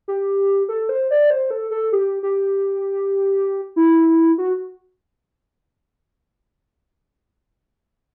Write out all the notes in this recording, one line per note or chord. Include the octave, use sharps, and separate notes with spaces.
G4
A4
C5
D5
C5
A4
A4
G4
G4
E4
F#4